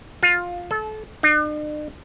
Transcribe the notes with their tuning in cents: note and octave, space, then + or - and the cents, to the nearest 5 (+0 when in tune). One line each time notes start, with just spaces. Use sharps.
F4 +15
A4 -30
D4 +45